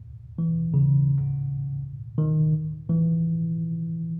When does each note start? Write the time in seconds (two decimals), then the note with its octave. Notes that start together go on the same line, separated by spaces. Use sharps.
0.39 E3
0.74 C#3
2.18 D#3
2.90 E3